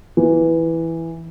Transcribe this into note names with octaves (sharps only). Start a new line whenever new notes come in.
E3